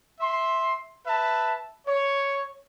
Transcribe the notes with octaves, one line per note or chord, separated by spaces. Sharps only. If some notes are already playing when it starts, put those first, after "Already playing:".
E5 C6
B4 E5 A5
C#5